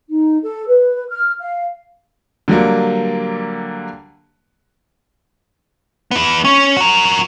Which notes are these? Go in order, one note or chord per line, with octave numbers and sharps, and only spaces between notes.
D#4
A4
B4
F6
F5
D3 F#3 G3 A#3
B3 E4
C#4
F#4 A#4